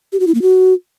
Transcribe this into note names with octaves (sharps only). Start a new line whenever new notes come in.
G4
F#4
E4
A#3
F#4